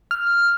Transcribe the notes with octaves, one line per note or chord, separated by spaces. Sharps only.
F6